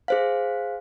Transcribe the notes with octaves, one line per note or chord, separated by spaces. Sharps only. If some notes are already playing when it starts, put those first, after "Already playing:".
G#4 C5 F5